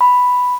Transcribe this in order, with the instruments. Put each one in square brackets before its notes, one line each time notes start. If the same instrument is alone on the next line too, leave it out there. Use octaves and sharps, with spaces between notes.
[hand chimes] B5